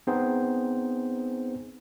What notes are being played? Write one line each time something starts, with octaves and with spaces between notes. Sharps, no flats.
B3 C4 D#4 G#4 C5